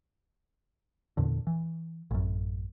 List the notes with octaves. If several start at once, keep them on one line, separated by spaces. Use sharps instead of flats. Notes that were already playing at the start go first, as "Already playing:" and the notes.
E2 A#2 D3
E3
A1 F#2